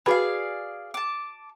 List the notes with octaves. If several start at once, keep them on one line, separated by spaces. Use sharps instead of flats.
F#4 G#4 B4 D5 F5 B5
A5 D6